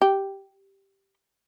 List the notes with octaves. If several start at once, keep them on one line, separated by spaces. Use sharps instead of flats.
G4